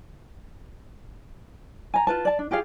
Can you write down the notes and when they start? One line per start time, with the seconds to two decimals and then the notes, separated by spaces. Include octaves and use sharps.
1.94 G#5 A#5
2.07 F4 B4 A5
2.25 D5 A5
2.39 D4
2.51 F4 G4 G#4 F5